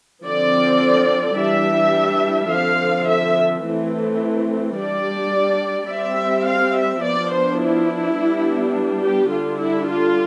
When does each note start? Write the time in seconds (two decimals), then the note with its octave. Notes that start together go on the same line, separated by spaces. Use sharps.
0.25 D3 F3 C4 D5
1.38 E3 G3 D4 E5
2.51 D3 F3 C4 F5
3.08 E5
3.64 E3 A3 C4
4.77 G3 D4 D5
5.91 G3 C4 E5
6.47 F5
6.76 E5
7.04 F3 B3 D4 D5
7.32 C5
7.61 E4
8.17 G3 B3 D4
9.02 G4
9.30 D3 G3 D4 F4
9.59 E4
9.87 F4